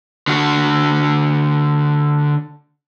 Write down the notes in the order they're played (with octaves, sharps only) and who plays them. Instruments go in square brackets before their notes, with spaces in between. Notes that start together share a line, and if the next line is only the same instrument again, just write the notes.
[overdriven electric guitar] D3 F#4